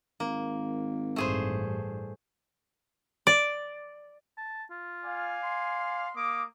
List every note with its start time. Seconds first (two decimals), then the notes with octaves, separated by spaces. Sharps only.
0.20 G#1 A#3
1.16 A1 G2 A3 G#4 C5
3.27 D5
4.37 A5
4.70 F4
5.05 D5 F5 G#5
5.43 C6
6.15 A#3 D6 D#6